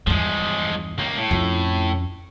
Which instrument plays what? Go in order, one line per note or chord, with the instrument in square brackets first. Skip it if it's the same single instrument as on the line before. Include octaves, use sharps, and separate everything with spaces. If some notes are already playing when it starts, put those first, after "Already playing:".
[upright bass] E2 G2 [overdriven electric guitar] F3 G#3
[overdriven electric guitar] C#2 A#3 [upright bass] G3
[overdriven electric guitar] A2
[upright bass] F2 C#4